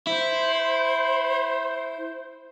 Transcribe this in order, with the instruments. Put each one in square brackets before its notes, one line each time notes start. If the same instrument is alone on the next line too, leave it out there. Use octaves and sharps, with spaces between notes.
[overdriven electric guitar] E4 [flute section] C5